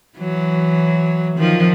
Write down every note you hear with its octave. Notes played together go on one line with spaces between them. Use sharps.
E3 F#3
D#3 F3